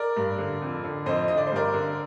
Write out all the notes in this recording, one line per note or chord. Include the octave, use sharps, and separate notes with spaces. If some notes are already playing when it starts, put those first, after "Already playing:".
Already playing: A#4 D5
G2
D3
F2
D3
F2 C5 D#5
D3 D#5
D5
C5
G2 A#4 D5
D3